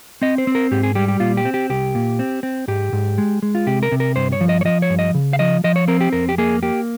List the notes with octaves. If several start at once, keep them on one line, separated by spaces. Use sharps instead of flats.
C4 D#5
C5
C4
A#4
G#2 G4
G#4
G3 G4
G4
A#2 F4
G4
C4
G4
C2 G4
A#2
C4
C4
G#2 G4
G#2
G#3
G#3
F4
C3 G4
A#4
C3
A#4
G2 C5
C#5
F3
D#5
C#5
F3 D#5
C#5
G2
D#5
C#3
F5
F3 D#5
F3 D#5
C#5
C4 A#4
G4
F2 A#4
G4
A#3 G#4
A#3 G4